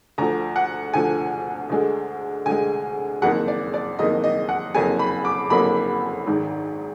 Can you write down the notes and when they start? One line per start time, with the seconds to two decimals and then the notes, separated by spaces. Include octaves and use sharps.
0.18 D2 D3 F3 A#5
0.56 F#5
0.94 D2 D3 F3 G#5
1.69 D2 D3 G#3
2.46 D2 D3 G#3 G#5
3.22 F#1 F2 D#3 A#3 F#5
3.48 D5
3.74 D5
3.98 F#1 F2 D#3 A#3 D#5
4.24 D#5
4.49 F#5
4.74 F#1 F2 D3 F#3 A#3 G#5
4.99 B5
5.25 D6
5.50 F#1 F2 D3 F#3 A#3 B5
6.27 G#1 G#2 D#3